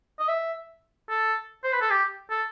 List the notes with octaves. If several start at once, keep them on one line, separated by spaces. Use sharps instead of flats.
D#5
E5
A4
C5
B4
A4
G4
A4